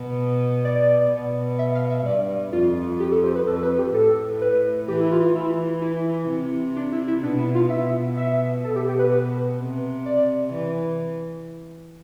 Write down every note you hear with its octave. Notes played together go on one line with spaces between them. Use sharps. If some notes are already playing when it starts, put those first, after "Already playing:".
Already playing: B2
D5
B2
E5
F5
E5
G2 D5
F2 F4
G4
A4
C5
B4
F2 A4
B4
G4
A2 A4
B4
E3 G4
E4
F4
F4
E3 E4
E4
C3
D4
E4
E4
B2 D4
E4
F4
B2 E5
E5
B2 A4
G4
G4
B4
B4
C3
D5
E3